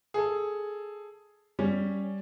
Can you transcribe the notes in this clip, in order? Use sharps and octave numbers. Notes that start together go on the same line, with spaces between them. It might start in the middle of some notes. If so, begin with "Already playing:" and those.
G#4 A4
G3 C#4